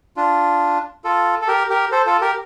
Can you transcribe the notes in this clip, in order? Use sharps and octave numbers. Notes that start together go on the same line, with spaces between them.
D4 F4
F4 A4
A4
G4 A#4
G4 A#4
A4 C5
F4 A4
G4 A#4